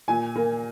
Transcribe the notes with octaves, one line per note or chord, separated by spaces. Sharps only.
A#2 G#5
A#3